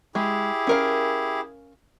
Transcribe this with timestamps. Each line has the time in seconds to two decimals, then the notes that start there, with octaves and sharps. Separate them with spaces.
0.15 G#3 E4 G4 G#4
0.67 C#4 A#4 F5